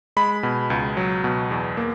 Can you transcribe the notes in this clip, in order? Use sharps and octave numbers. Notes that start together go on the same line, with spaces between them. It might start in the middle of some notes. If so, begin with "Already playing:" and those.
G#3 B5
B2
C#2
F#3
B2
E2
A#3